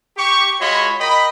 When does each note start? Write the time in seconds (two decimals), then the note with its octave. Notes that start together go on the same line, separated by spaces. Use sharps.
0.16 G4 C#6
0.60 G#3 F4 F#4 C#5 D#5 B5
0.99 A#4 D#5 G5 B5